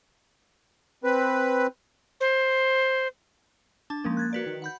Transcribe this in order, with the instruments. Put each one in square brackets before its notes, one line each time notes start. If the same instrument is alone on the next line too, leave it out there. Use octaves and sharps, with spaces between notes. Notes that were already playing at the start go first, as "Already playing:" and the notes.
[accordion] C4 B4
[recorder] C5
[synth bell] D4 A5
[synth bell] F3 G#3 C#4 [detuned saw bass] A#3
[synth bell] F#6 G#6 A6
F#4 B4 D5
[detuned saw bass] D#3
[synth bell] F#5 B5 G6